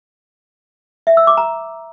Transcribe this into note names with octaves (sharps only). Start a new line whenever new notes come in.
E5
E6
D6
A#5